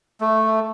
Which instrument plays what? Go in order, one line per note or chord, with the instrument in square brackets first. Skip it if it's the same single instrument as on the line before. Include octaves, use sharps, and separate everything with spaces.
[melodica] A3